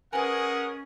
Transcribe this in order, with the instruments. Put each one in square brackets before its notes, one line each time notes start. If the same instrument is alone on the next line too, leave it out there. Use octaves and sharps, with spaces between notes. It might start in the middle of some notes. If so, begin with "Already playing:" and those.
[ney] C#4 [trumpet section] G#4 D#5 F#5 [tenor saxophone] A#4 [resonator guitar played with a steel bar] B4 G#5